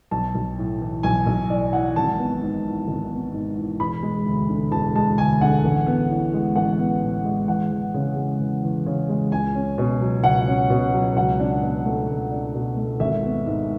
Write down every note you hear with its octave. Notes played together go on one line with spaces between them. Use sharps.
B1 A5
B1
A2
E3
B1 G#5
B1
A2 D5
E3 F#5
G#1 A5
B3
G#2
E3
G#1
B3
G#2
E3
E1 B5
G#3
D2
D3
E1 A5
G#3 A5
D2 G#5
D3 F#5
A1
B3
A2
G#3
A1 F#5
B3
A2
G#3
E2 F#5
E2
C#3
G#3
E2
E2
C#3
G#3
C#2 G#5
C#4
B2
F#3
C#2 F#5
C#4
B2
F#3
C#2 F#5
D4
B2
A3
C#2
D4
B2
A3
G#1 E5
B3
G#2